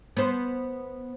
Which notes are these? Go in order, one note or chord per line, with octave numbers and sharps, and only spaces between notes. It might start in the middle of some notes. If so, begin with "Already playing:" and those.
B3 C5